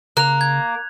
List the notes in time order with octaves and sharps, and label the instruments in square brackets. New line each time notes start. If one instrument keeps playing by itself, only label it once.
[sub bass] C#3 [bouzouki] A#3 [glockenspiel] F#6 F7
[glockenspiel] G#6